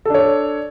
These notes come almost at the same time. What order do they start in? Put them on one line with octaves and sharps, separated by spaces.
A4 D4 C#5